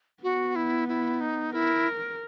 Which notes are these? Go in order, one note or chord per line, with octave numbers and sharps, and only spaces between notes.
B3 F#4
E4
E4
D#4
E4 A#4